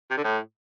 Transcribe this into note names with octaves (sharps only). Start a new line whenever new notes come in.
C3
D3
A2